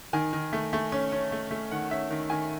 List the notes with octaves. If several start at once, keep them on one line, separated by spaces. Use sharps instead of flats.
D#3 G#5
D#3
A3
A3
C#4
C#4
A3
A3
D#3 F#5
C#4 E5
D#3
D#3 G#5